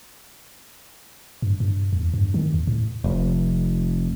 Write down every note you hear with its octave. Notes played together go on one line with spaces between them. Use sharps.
G2
G2
E2
G2
D#3
D#2
A2
F1